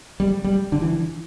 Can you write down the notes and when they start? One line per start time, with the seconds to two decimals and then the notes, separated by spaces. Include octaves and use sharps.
0.20 G3
0.44 G3
0.72 D3
0.82 E3